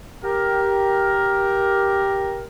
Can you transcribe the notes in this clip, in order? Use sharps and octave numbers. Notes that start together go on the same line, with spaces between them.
G4 A#4